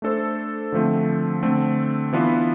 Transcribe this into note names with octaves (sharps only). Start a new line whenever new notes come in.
A3 D4 A4 C5
D3 F3 A3 C4
D3 A3 C4
E3 B3 D4 F4 B4